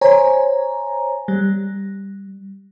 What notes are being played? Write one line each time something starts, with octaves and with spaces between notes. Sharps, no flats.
C5 C#5 G#5 A#5
G3